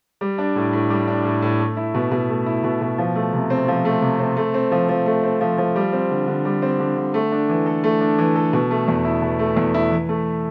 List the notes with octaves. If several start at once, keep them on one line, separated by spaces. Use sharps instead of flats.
G3
D4
A2
A2
G3
D4
A2
A2
A3
E4
B2
B2
A3
E4
B2
B2
F3
A3
C3
C4
F3
A3
C3
C4
A3
C4
F3
F3
A3
C4
F3
F3
G3
C4
D3
D3
G3
C4
D3
D3
A3
D4
E3
A4
A3
D4
E3
A4
B2
A3
E2
E4
B2
A3
E2
E4
E3
A3